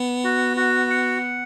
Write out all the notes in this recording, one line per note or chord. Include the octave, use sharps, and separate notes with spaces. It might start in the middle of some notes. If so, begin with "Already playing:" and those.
Already playing: B3
F#4
F#4
F#5